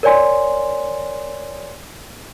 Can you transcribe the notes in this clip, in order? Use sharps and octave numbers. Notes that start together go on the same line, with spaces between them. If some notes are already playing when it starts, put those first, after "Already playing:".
A#4 C#5 D5 G#5 C6